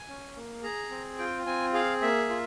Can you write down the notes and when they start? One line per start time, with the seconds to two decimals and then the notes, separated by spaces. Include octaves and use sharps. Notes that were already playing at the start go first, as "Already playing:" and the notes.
Already playing: G#5
0.08 C#4
0.36 A#3
0.63 G#4 A#5
0.91 C4
1.19 F4 G5
1.46 C4 G#5
1.73 G#4 F5
2.02 A#3 E5
2.30 F4